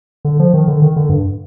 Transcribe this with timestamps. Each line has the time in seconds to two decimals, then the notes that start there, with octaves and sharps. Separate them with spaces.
0.25 D3
0.40 F3
0.54 D#3
0.68 D3
0.82 D#3
0.96 D3
1.09 G2